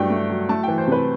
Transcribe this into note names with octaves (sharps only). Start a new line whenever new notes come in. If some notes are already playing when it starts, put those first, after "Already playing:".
Already playing: G2 F#3 A3 D4 G5
A3
F#3
A3 A5
E3 G5
C5
C3 B4